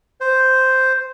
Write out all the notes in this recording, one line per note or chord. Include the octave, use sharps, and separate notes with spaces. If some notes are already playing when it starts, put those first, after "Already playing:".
C5